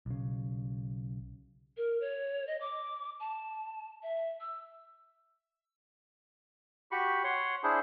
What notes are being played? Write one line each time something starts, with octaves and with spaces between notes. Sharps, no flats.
B1 C#3
A#4
C#5
D#5
D6
A5
E5
E6
F#4 G4 B5 C#6
C#5 F#5 C6
D4 E4 G#4 C5